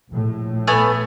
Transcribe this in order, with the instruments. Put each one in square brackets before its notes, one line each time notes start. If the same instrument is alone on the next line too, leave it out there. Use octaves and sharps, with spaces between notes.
[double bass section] A#1 A2
[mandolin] A3 B3 G#5